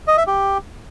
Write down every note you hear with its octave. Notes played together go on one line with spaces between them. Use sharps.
D#5
E5
G4